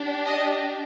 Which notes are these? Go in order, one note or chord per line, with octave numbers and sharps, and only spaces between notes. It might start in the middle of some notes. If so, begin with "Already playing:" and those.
Already playing: D4 G4
D#5